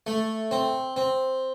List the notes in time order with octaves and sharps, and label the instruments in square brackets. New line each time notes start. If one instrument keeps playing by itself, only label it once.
[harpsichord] A3
C4
C4